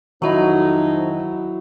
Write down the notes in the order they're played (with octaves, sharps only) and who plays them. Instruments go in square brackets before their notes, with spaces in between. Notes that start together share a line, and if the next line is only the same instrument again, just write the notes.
[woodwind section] F2 F3 D#4 [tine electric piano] D#3 F#4 D#5 [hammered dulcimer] F#3 E4